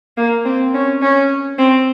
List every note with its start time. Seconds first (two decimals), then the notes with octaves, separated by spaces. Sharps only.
0.17 A#3
0.45 C4
0.74 C#4
1.02 C#4
1.58 C4